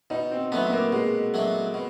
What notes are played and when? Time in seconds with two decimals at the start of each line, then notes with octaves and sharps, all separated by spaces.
0.10 B2 D#4
0.31 C4
0.52 F#3 A3 B3 D4
0.67 B3
0.73 A#3
0.92 B2 G#3
1.34 F#3 A3 D4
1.74 B2